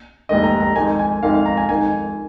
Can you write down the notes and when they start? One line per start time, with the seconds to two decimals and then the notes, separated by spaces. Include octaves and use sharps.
0.29 F1 D#2 D#3 G#3 D#5
0.44 A#5
0.60 A#5
0.75 F2 D#3 G#3 D#4 A#4 G#5
0.99 G#5
1.22 F2 D#3 G#3 D#4 A#4 F5
1.34 F5
1.46 A#5
1.57 G#5
1.69 F2 D#3 G#3 D#4 A#4 G#5